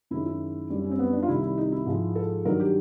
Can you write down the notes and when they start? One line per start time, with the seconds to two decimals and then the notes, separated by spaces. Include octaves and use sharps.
0.11 F#2 D#3 G#3 E4
0.26 E4
0.70 F#2 D3 G3
0.84 C#4
0.91 C4
0.99 B3
1.13 D4
1.23 F4
1.28 C2 C3 D#3 G3 E4
1.42 E4
1.58 D#4
1.72 E4
1.86 G#2 F3 G#3
2.16 A4
2.45 G2 D#3 F#3 A#4
2.60 G4